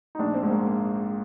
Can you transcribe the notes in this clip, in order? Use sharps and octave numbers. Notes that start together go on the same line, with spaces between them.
D#4
A#1 D4
C4
G#2
A#3
A#3